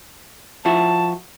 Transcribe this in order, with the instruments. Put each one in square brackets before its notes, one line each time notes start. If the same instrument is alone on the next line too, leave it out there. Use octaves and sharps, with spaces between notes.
[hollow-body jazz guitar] F3 E4 F#4 [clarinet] A5